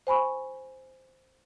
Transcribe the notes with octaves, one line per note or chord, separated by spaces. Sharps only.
C5 G#5 B5 C#6